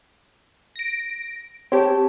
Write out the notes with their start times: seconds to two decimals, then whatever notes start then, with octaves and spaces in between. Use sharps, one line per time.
0.76 A#6 D7
1.72 C4 G4 C#5 A5